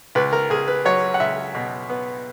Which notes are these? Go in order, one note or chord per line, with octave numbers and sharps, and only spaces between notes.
C#2 B4
A#4
C#2 G#4
B4
F#3 C#5
F#5
C#2 E5
B2
B3